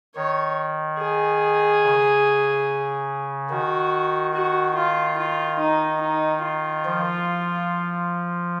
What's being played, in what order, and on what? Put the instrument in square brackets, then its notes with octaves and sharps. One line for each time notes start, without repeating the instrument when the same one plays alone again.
[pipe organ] D#3 [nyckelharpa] C#5
[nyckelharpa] G#4
[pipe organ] C#3
[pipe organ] D#3 [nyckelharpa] F#4
[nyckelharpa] F#4
F4
F4
D#4
D#4
F4
[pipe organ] F3